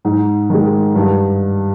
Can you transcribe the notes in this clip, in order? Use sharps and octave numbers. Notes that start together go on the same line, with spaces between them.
G#2
D#3 G#3
G2